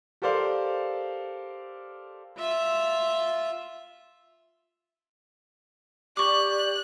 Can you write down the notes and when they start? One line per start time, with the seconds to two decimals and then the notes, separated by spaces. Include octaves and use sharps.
0.22 G4 A4 A#4 C5 D5 F5
2.39 F4 E5
6.17 G4 D5 C#6 D6 F#6